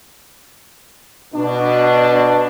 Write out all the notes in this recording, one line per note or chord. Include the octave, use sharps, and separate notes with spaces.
B2 D4